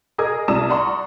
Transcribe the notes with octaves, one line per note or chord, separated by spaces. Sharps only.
G#4 A#4 D#5 D#6 G#6
C2 D5 A5 A#5 D#6 E7
D5 F#5 A#5 C6 C#6